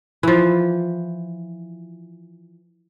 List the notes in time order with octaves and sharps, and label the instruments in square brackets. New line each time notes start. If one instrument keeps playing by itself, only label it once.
[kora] E3 F3